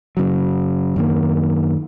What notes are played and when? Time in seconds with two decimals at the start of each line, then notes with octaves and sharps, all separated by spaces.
0.17 F#2 C#3 F#3
0.96 F#2 D#3 A#3